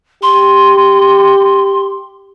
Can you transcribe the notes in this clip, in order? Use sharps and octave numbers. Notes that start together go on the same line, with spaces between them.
G4 C6